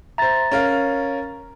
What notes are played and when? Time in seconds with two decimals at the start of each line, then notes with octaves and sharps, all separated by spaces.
0.18 C5 E5 A#5 A6
0.51 C#4 A#4 F5